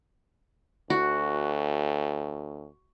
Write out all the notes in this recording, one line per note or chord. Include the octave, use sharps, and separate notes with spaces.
D2 F#4